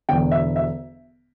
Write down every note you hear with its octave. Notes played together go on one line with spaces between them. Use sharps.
E1 E2 D3 G5
E5
E5